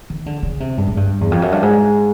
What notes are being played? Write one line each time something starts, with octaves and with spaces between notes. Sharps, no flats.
D#3
D3
C#3
C3
G2
G#2
G2
E2
F2
F#2
G2
G#2